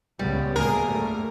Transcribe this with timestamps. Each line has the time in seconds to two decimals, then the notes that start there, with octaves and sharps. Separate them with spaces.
0.19 C#2 C#3 G3 B3
0.56 D2 G#2 A#3 G#4 A#4
0.87 G3 A3